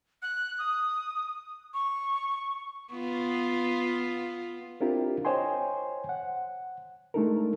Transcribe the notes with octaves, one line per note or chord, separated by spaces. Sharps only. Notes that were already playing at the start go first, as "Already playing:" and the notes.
F#6
D#6
C#6
B3 F4
C4 D4 E4 F4 G4 A#4
C5 C#5 D#5 G5 G#5 C6
F#5
G#3 A3 D4 D#4 A4 A#4